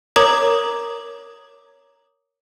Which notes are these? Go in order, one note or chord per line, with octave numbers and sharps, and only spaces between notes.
A#4 C#5 A#5 D6 D#6 G#6